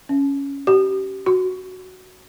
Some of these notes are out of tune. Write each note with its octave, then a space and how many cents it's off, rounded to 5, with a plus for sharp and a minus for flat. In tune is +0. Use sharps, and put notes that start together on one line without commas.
C#4 +5
G4 -30
F#4 +0